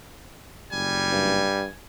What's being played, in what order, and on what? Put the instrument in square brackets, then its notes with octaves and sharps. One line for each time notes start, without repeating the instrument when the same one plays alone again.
[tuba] F#1 [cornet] G3 [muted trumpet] G#5
[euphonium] G2